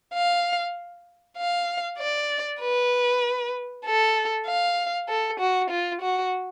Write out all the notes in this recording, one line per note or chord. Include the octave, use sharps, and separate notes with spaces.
F5
F5
D5
B4
A4
F5
A4
F#4
F4
F#4